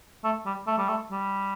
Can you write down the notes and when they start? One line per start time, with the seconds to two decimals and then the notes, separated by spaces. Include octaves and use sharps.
0.24 A3
0.46 G3
0.67 A3
0.78 G3
0.89 A3
1.11 G3